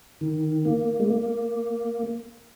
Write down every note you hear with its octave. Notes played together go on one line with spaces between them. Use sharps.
D#3
A#3
G#3
A#3